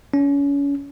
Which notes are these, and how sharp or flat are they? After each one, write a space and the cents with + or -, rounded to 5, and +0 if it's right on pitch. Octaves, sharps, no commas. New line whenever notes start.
C#4 +30